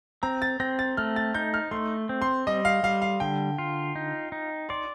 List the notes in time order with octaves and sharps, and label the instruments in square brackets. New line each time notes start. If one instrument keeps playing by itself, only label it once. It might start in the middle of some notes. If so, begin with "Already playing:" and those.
[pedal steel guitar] C4 [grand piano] A#5
[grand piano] A6
[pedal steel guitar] C4 [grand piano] A#6
[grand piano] A6
[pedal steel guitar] A3 [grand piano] F6
[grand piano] A6
[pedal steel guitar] D#4 [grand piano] G6
[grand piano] F6
[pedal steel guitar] A3 [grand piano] C6
[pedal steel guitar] C4
[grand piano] C6
[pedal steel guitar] G3 [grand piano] D#5
[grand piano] F5
[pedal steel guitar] G3 [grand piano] F5
[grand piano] F5
[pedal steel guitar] D3 [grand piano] G5
[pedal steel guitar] F4
D#4
D#4
[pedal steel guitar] D5 [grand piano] C6